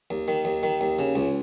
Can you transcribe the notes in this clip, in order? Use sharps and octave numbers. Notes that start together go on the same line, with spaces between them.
D#2
D#3
D#2
D#3
D#2
C#3
C#2